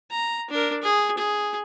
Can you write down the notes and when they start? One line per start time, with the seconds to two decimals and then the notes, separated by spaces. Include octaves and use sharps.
0.11 A#5
0.50 D4 A#4
0.83 G#4
1.18 G#4